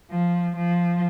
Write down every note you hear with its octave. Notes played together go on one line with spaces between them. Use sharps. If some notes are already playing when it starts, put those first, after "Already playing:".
F3
F3